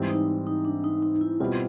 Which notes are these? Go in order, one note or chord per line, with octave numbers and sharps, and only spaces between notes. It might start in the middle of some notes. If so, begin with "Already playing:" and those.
Already playing: G#2 E3 G3 C4
D#4
D#4
D4
D#4
D#4
E4
B2 G3 C4 E4 F4